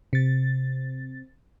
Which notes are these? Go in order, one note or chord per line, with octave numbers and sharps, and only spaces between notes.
C3 A6